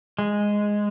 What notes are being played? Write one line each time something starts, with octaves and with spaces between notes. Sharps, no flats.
G#3